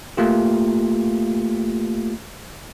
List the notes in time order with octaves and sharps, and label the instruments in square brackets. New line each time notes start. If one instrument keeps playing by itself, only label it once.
[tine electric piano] A3 A#3 F4 G4